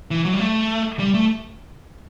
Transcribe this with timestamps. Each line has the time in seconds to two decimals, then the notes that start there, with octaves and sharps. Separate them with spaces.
0.11 E3
0.25 F#3
0.34 G3
0.40 A3
0.99 G3
1.14 A3